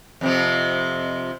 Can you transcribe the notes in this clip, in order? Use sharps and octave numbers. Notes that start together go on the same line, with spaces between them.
F2 C3 F3